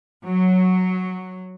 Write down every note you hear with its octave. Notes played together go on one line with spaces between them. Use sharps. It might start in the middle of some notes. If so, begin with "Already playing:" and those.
F#3